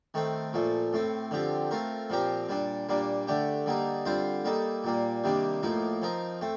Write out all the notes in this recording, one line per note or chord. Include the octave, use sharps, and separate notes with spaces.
D#3 A3 C4
A#2 F3 A3
A2 A3 C4
D3 F3 C4 G4
A3 C4 F4 A#4
A#2 F3 C4 G4 A#4
A#2 G3 D4
A#2 G3 A#3 D4
D3 A3 D4 G4
D3 G3 A#3 D#4
D3 G3 C4 F4 C5
G3 A#3 D#4 A4
A#2 G3 A#3
C3 D#3 G3 A#3 D4
A2 F3 A#3 D#4
F3 C4 D#4 A#4
A3 C4